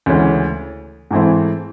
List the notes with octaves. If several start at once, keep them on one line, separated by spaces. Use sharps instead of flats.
D2 C#3 E3 G#3 C#4
G#2 E3 A3 C4 E4